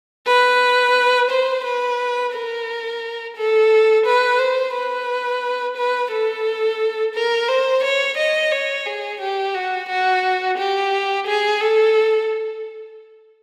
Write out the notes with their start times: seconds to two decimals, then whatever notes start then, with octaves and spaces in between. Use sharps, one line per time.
0.27 B4
1.30 C5
1.64 B4
2.34 A#4
3.37 A4
4.05 B4
4.39 C5
4.74 B4
5.77 B4
6.11 A4
7.15 A#4
7.48 C5
7.83 C#5
8.17 D#5
8.52 C#5
8.86 G#4
9.20 G4
9.54 F#4
9.89 F#4
10.58 G4
11.27 G#4
11.61 A4